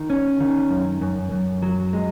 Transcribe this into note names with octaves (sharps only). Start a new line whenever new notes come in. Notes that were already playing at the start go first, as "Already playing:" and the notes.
Already playing: D#3
C#4
D#3
F#2
F#2
F#2
F#3
G#3